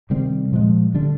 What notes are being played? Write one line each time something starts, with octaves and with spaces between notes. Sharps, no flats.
C3 D#3 G3 C4
A#2 F3 G#3
D3 G3 D4